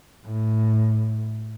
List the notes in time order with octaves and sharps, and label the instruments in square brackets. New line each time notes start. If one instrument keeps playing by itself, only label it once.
[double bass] A2